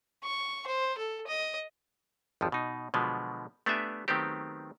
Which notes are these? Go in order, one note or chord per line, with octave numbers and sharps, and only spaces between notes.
C#6
C5
A4
D#5
G#1 F2 F3
B2 D#4
B2 D3 F3 F#3 G#3 B3
A3 B3 D4 G4 E5 G#5
D#3 F#3 A3 B3 C4 G4